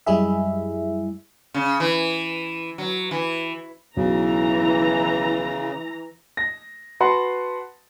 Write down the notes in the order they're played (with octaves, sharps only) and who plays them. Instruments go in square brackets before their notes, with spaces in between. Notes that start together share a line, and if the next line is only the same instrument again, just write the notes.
[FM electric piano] F#2 G3 G#3 E4 G#4 E5
[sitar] C#3
E3
F#3
E3
[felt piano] B1 [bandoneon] C#3 [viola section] E3 A#5
[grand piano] A#6
F#4 B4 F#5 A5 B5 C6